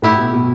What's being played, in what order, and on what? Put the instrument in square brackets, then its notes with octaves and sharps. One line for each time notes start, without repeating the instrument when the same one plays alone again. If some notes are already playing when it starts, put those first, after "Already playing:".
[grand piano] A2 [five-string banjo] B3 E4 G4
[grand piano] B2
B2